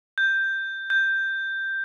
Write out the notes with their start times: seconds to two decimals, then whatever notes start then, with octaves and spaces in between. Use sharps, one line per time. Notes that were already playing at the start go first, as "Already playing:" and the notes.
0.18 G6
0.90 G6